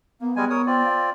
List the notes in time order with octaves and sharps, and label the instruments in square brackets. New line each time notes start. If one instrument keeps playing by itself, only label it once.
[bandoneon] A#3 [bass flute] B3
[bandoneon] G3 G#3 G#5
A#4 C#5 D#6
C4 F4 D5
[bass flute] F5